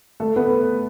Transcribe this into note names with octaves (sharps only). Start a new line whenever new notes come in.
A3 A4
B3 B4